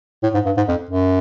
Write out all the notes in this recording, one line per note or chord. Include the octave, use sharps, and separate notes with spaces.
A2
G#2
G2
G#2
F2
F#2